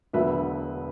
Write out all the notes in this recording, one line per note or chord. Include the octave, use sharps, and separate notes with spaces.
E1 D2 D3 F#3 B3 B4 E5